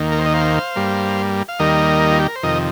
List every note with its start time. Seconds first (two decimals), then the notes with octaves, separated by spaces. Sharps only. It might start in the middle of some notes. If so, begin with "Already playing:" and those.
Already playing: D#2 D#3 A#3
0.12 A#4
0.19 C5
0.26 D#5
0.34 C5 F5
0.76 G2 G3 A#3
1.48 F5
1.59 D#2 D#3 G3 A#3 A#4 D#5
2.11 F4
2.19 G4
2.28 A#4
2.36 C5
2.43 F2 C3 D#3 A#4 D#5